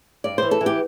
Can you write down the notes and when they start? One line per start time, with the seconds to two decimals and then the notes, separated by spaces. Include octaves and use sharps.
0.24 G2 D5
0.38 E3 C5
0.51 A4
0.61 E3
0.66 G4